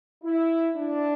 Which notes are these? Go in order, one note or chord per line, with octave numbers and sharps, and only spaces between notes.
E4
D4